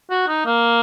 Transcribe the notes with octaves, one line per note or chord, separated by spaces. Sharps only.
F#4
D#4
A#3